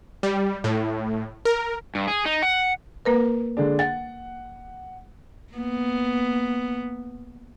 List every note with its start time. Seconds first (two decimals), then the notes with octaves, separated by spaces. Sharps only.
0.23 G3
0.64 A2
1.45 A#4
1.95 G2
2.08 G#4
2.26 D#4
2.42 F#5
3.05 A#3 A#4 B4
3.57 D3 G#3 D4
3.79 F#5 A6
5.53 A#3 B3